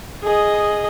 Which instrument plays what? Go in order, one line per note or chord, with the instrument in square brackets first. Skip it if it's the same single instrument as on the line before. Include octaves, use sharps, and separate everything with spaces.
[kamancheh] G#4 D#5